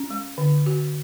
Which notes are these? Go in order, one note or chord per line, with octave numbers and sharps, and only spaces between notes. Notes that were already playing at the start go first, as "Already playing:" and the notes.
Already playing: C#4
G#3
D3
F#4